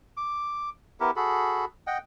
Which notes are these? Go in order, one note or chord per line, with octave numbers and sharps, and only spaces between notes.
D6
B3 E4 G4 A#4
F#4 G#4 A4 B5
D#5 F#5 G5